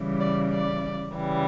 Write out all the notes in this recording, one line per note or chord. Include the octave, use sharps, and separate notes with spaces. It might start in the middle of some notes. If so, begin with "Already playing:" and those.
Already playing: C#3 E3 G3
D5
D5
C#3 E3 G3